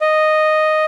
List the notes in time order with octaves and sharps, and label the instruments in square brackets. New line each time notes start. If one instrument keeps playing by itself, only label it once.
[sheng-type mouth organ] D#5